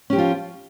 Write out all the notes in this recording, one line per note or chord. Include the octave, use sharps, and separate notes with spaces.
F3 C#4 F4 G4